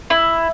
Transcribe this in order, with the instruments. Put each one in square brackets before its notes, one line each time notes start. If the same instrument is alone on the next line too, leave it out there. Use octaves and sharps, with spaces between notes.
[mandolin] E4